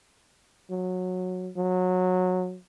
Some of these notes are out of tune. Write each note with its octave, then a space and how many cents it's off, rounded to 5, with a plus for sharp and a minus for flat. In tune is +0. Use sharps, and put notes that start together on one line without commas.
F#3 -15
F#3 -20